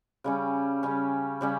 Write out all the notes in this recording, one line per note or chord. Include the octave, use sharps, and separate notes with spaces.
C#3 G3 C#4
C#3 G3 C#4
C#3 G3 C#4